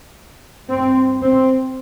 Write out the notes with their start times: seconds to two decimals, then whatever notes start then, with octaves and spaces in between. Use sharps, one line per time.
0.70 G2 C4
1.22 C4